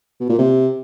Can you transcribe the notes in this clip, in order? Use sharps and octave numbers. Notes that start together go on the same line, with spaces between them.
B2
A#2
C3